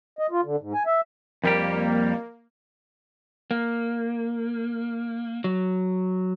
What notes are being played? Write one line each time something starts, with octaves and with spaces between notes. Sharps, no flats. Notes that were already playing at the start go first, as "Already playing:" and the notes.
D#5
F4
D3
G#2
G#5
E5
F2 G3 A#3 G4
A#3
F#3